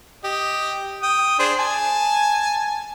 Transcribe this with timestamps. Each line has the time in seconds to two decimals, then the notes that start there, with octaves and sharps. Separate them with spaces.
0.24 G4 D#5
1.03 G5 D#6
1.39 D4 G#4 C5
1.59 G#5 A5